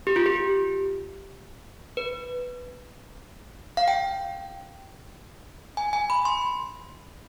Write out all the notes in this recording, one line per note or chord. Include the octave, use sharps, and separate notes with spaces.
G4
F4
G4
B4
F5
G5
G#5
G#5
B5
C6